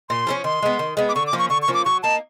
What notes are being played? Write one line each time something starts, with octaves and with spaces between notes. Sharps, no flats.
A#2 C6
F3 A3 C#4
D#3 C6
G#3 B3
D#3
G#3 B3
D6
D3 C#6
D6
F3 A#3 C#4
C#6
D3 C#6
C#6
F3 A#3 C#4
D6
F#3 C#6
A#3 D#4 A5